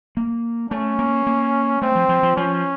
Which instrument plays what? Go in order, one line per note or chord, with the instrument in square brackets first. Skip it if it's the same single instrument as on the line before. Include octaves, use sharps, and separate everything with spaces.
[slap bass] A#3
[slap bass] A3 [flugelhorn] C#4
[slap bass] A#3
A#3
[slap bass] A3 [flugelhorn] C4
[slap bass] F3
F3
F3
[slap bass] F3 [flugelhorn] C#4